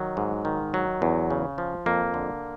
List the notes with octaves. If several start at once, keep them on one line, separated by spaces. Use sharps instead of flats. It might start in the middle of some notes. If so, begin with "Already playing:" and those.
Already playing: D#3 F#3
G#2
D#3
F#3
E2
C#3
F3
F2 A#3
D3